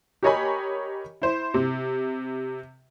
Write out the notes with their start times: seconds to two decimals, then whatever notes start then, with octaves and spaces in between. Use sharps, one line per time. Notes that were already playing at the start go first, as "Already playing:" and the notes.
0.23 G4 A#4 C#5 D#5 G#5 B5
1.22 E4 C5
1.54 C3